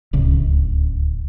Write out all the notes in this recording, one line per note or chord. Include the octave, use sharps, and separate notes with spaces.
D1 C#2